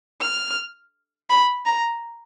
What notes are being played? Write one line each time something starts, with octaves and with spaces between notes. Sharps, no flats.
F6
B5
A#5